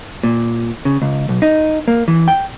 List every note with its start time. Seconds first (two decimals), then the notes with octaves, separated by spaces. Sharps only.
0.23 A#2
0.85 C#3
1.02 C#2
1.29 B1
1.42 D#4
1.88 A#3
2.08 E3
2.28 G5